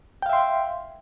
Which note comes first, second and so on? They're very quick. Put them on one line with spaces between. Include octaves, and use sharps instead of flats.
G5 F5 E5 C6